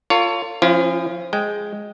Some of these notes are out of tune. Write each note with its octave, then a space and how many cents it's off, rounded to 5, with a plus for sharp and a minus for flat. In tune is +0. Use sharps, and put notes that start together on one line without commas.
F4 +0 A4 +40 C#5 +20
F3 +0 C#4 -25 E4 +45
G#3 +0 G5 +0